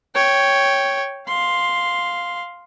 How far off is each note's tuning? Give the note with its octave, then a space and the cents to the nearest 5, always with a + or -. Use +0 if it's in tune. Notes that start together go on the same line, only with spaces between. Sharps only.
C#5 +0 G5 +0
F5 +5 C6 +0